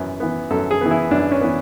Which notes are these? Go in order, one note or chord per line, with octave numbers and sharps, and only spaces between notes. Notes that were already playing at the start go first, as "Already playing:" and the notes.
Already playing: F#2 E3 B3
E3 B3
F#2 A4
G#4
E3 B3
E4
F#2 D4
C#4
E3 B3